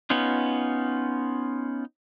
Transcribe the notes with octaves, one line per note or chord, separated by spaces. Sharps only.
B3 C#4 D#4 F4